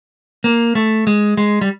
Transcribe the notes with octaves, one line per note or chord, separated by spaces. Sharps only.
A#3
A3
G#3
G#3
G3